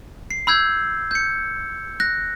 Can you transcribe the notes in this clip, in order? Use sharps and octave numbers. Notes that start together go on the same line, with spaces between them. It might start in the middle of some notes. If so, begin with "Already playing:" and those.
C7
B5 E6 G6 G#6
G6 C#7
F#6 A#6